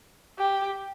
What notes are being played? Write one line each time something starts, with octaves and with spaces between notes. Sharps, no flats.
G4